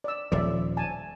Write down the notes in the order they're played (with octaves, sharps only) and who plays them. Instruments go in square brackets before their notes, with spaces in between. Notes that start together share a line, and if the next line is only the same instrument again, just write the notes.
[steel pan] D5 E6
[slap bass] D#1 F3 [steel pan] D5 E5
[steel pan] G#5 A5